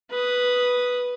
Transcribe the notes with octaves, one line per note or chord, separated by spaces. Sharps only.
B4 D#6